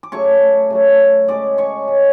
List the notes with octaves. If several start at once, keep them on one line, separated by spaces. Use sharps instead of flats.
D6
C#3 F#3 A3 C#5 C#6
C#3 F#3 A3
C#3 G#3 C#4 D5 D6
C#5 C#6
C#3 G#3 C#4